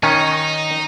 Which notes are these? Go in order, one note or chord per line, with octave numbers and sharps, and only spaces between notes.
D#3 C#4 D#4 G#5